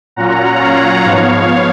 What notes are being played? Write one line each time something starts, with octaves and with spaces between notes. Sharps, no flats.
A#2 F#3 C#4 F4 F#5 A#5
C#5 F5
G#2 F3 B3 C#5 F5